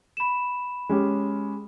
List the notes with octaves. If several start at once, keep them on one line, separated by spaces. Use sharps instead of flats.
B5 E7
G#3 C#4 G4